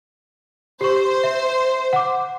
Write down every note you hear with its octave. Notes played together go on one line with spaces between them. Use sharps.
G4 C5 C#6
E5
F#5 D6